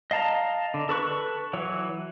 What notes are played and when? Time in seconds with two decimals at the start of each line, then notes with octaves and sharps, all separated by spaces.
0.11 D#5 F5 A5 A#5
0.74 D3
0.89 A4 B4 C#6 F#6
1.53 E3 F#3 C#5